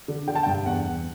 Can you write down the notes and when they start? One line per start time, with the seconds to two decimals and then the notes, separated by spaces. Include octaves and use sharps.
0.08 D3
0.28 D3 G5
0.36 A5
0.43 G2 G5
0.66 E2 F#5
0.85 E2